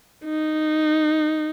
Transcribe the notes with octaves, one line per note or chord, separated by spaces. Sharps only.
D#4